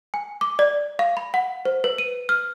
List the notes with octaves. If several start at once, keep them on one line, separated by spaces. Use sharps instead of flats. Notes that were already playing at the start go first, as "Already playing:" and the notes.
G#5
D6
D5
F5
B5
F#5
C5
B4
D#7
F6